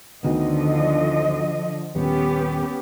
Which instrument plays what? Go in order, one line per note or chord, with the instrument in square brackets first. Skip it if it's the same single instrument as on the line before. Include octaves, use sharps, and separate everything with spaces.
[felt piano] D2 D#3 B3 [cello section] D3 F3 D#5
[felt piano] D#1 [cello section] B3 C#4 G4